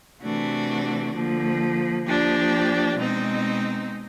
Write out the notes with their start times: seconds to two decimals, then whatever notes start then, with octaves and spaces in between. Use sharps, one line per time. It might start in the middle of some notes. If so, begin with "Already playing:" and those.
0.23 C3 E3 A3 D4 F#4
1.15 D3 F3 A#3
2.06 F3 A#3 D4 G4
2.97 B2 G#3 C4 D#4